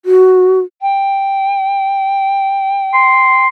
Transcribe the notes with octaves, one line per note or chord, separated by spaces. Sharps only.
F#4
G5
C6